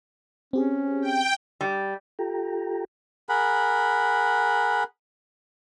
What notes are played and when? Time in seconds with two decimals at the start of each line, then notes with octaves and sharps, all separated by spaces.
0.53 C4 C#4 G4 G#4
1.02 G5
1.61 G3
2.19 F4 G4 A4 G5 A#5
3.29 G#4 A#4 F#5 B5